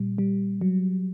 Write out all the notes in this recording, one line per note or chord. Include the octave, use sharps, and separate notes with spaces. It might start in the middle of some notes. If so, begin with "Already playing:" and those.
Already playing: A#2 G3
G3
F#3